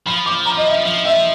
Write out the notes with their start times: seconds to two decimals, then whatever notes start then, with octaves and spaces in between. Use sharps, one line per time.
0.06 F3 B5
0.26 D6
0.46 A#5
0.57 D#5
0.66 E5
0.85 F3
1.05 E5